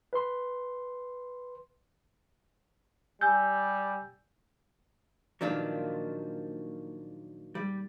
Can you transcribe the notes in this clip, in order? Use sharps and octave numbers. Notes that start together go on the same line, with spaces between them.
B4 C6
G3 G#5 E6 G6
A#2 D#3 F3 F#3 A#3 D4
G3